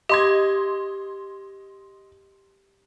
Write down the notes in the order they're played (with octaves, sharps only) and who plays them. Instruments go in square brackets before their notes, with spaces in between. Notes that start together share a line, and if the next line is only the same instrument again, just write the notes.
[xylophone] G4 [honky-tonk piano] D#5 C6 G#6